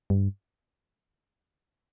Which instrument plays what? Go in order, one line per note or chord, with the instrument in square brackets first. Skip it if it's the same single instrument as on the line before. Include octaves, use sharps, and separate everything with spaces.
[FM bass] G2